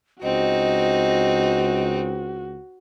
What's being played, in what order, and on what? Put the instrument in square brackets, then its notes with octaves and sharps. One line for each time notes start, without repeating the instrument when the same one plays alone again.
[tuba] C#2 [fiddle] C4 D#4 [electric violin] F#4 [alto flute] D#5